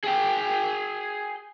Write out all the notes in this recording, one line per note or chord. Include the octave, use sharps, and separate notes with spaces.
G#4 G5